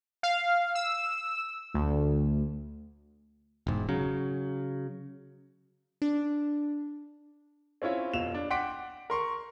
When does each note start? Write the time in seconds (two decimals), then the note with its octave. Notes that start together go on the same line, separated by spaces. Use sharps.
0.23 F5
0.75 E6
1.74 D2
3.67 E1 G#2
3.89 C#3 F#3
6.02 D4
7.82 C4 C#4 E4 F4 C#5
8.13 F1 B2 F4 E7 F7
8.34 D4
8.51 F#5 G5 C6 D6 B6 D7
9.10 A#4 C6 C#6